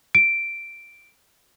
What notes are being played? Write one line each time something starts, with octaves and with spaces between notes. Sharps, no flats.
D7